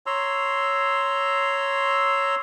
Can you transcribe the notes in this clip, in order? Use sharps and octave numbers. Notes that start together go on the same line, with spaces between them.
C#5 A#5 C6 E6